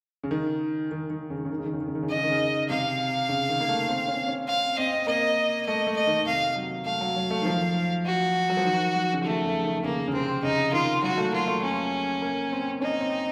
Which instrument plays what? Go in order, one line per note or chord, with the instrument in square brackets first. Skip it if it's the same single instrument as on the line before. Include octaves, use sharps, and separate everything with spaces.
[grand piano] C#3
D#3
D#3
D#3
C#3
D#3
C#3
D#3
C#3
D#3
C#3
D#3
C#3
D#3
C#3
[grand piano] D#3 [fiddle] D#5
[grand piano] C#3
D#3
C#3
[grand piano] C3 [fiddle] F5
[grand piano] C#3
D#3
A#3
A3
C4
C#4
C#4
[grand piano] C4 [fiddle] F5
[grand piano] C4 [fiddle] D#5
[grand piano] A#3 [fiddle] D#5
[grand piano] A3 [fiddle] D#5
[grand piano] A3
[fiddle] D#5
[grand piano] D#3
[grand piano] C3 [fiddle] F5
[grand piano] F#3
[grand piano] A3 [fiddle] F5
[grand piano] F#3
F#3
A3
D#3
F3
[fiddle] F#4
[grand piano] F#3
F3
D#3
F3
C#3
[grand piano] D#3 [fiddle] A3
[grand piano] C#3
D#3
[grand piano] C#3 [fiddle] A#3
[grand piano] C#3
[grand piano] C3 [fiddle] C4
[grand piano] C#3 [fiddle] D#4
[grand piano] D#3 [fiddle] F4
[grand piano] F#3 [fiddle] F#4
[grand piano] A3
[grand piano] A#3 [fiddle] F4
[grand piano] A3
[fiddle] C#4
[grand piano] A#3
C4
[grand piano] C#4 [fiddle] D#4
[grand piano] C4